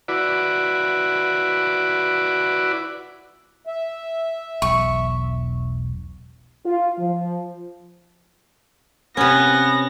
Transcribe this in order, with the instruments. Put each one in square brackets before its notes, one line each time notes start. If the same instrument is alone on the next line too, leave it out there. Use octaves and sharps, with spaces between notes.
[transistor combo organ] E4 F#4 B4 D5
[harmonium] E5
[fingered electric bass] E1 B1 [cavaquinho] C#6
[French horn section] F4
F3
[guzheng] C3 C#4 [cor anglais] B3 [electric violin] A#6